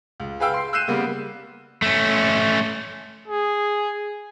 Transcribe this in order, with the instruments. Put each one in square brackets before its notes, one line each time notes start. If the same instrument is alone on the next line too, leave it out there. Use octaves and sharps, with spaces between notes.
[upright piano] C#2
G#4 B4 F5 G5 E6
C6 C7
E6 F#6 G6 C7 D#7 E7
C#3 G3 A#3 B3
[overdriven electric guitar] A3 C#4
[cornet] G#4